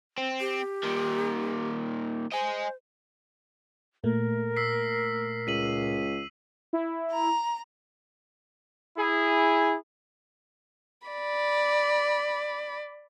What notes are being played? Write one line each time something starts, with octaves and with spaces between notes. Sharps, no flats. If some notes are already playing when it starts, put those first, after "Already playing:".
C4
G4
A#2 D#3
C5 D#5 G#5
A#2 A3 A#4
E6 B6 C7
C#2 B6 D#7 F#7
E4
A#5
E4 G#4
D5 B5